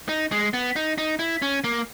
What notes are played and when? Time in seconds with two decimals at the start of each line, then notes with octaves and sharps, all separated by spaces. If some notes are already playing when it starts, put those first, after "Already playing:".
0.09 D#4
0.32 G#3
0.54 B3
0.76 D#4
0.98 D#4
1.19 E4
1.42 C#4
1.64 A#3